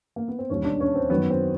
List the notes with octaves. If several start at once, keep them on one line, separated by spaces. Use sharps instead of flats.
A#3
B3
C4
E1 D#2 D#3 G3 C#4
D4
C#4
C4
F#2 D#3 F#3 B3
C4